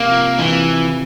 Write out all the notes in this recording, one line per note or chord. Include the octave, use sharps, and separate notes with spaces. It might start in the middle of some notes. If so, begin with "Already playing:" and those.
Already playing: C3 A#3
F3
C3 E3